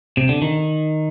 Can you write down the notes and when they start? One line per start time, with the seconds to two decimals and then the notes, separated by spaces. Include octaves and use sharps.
0.17 C3
0.29 D3
0.42 D#3